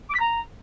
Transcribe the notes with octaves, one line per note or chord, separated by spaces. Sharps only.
D6
B6
A#5